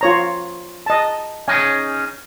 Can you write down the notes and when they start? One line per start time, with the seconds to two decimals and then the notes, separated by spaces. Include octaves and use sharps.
0.01 F4 C#5 A#5
0.86 D#5 A5
1.48 C#4 D#4 G#4 G#5